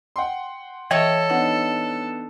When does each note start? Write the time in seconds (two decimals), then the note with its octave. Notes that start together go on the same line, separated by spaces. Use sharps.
0.16 F#5 G5 C6
0.91 E3 A4 C#5 D#5 G5
1.30 B3 D4 D#4 F#5